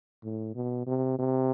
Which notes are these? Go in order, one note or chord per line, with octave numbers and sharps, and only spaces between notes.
A2
B2
C3
C3